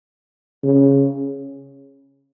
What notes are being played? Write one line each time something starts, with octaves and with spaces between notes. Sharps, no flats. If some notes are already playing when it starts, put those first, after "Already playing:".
C#3